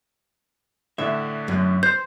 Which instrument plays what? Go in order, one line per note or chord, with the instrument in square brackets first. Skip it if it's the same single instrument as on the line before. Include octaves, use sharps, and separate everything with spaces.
[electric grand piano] A2 D3 [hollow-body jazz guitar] E5
[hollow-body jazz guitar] F#2
[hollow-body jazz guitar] C5 [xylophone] G6